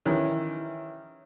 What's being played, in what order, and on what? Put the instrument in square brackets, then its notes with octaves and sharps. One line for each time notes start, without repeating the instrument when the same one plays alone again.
[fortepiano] D#3 E3 C#4